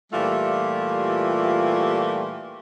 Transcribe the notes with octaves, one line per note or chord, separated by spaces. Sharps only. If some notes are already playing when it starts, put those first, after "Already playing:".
A#2 E3 G3 A3 F4 G4